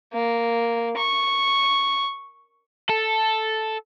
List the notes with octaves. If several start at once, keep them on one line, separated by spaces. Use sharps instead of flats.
A#3
C#6
A4